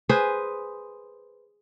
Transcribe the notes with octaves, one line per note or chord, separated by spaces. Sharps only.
G#4 B4 C5